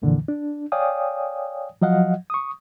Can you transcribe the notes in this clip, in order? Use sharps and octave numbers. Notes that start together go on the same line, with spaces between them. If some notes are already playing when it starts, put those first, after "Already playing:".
C2 F2 A#2 D3 E3
D4
C#5 D5 F5 G5 G#5 D#6
F3 F#3 D#5 F5 F#5
C#6 D#6